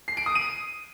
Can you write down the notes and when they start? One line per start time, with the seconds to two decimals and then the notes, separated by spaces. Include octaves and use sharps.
0.08 C7
0.17 D7
0.26 D#6
0.35 D#7